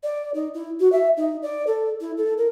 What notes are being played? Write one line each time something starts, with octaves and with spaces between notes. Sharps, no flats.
D5
D#4
E4
F#4
E5
D#4
D5
A4
E4
A4
A#4